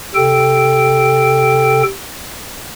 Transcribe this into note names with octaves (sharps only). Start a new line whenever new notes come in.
C3 A4 G5